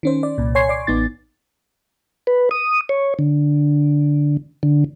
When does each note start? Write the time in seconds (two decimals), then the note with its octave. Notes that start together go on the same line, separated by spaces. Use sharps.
0.03 D#3 C#4 C5
0.23 D5
0.38 C2 A#2
0.55 C#5 G#5 C6 C#6 G#6 C7
0.69 D5 D6
0.87 A1 B3 D#4 A6
2.27 B4
2.51 D#6
2.89 C#5
3.19 D3
4.63 D3